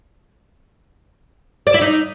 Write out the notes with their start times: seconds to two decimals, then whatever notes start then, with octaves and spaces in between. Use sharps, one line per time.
1.67 D5
1.74 E4
1.81 D#4